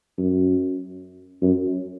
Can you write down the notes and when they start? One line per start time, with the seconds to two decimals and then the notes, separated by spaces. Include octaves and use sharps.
0.18 F#2
1.42 F#2